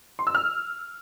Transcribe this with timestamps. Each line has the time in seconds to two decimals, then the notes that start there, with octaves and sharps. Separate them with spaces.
0.19 C6
0.27 E6
0.35 F6